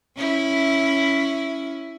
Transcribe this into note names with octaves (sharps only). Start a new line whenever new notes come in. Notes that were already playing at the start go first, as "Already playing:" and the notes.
C#4 E4